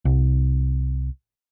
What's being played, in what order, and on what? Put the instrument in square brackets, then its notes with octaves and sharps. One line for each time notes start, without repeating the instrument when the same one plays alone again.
[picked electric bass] C2